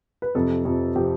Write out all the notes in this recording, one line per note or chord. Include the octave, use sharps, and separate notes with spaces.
B4
F2 C3 F3 A4
F2 C3 F3
C3 F3 G4